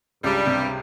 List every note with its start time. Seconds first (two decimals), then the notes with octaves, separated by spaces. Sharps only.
0.23 C#2 G2 G3
0.46 C3